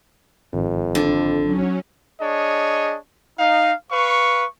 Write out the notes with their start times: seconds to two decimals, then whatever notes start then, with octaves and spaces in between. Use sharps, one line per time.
0.54 G#1 F2
0.95 D3
1.44 F#3 C#4
2.21 D4 G#4 C#5 D#5
3.39 D#4 F5
3.92 B4 F5 C#6